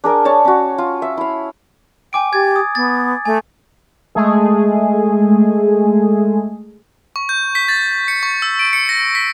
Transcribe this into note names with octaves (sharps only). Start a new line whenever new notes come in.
D4 G#4 A#4 D5
C#5 D5 A5
C#4 F#4
F4
E5
E4 F5
G5 G#5 D6 D7
G4 G#6 A6
D#6
B3 A6
A3 G#5
G#3 A3 G#4
C#6
G6
B6
A6
C#7
C#6
E6
D7
C#7
A#6
B6